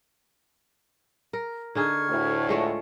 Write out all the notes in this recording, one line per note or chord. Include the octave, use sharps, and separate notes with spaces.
A#4
D3 D#4 G#4 C#6 F6 G#6
D2 A2
G#3 A3 F4 C#5